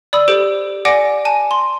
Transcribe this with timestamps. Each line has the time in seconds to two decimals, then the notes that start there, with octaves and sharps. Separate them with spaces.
0.13 D5 B5 D#6 E6
0.28 G4 A4 C5 D7
0.85 D5 F#5 G#5 D6 A#6 D7
1.25 G#5 A5 D#7
1.51 C6